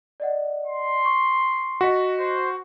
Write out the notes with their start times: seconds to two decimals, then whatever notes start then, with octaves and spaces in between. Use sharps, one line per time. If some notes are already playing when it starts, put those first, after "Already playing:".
0.20 D5 D#5 F#5
0.67 C6
1.05 C#6
1.81 F#4 D#5 B6 C#7
2.19 C5